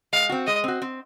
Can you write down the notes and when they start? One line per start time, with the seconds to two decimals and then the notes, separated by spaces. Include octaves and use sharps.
0.13 G#3 F5
0.29 C4 F#4
0.47 G#3 D#5
0.64 C4 F#4
0.82 C4